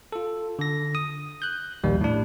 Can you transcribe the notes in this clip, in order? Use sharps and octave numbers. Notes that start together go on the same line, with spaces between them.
F4 A4
D3 A#6
D#6
F#6 G6
A#1 D#2 G3
A2 D4